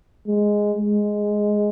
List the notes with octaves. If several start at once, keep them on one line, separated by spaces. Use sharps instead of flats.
G#3
G#3